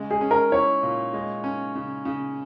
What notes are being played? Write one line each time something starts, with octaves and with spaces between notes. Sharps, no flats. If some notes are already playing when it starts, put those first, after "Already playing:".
Already playing: C#3 G#3
G#4
C#4
A#4
E4 C#5
A#2
G#3
C#4
C#3
C#3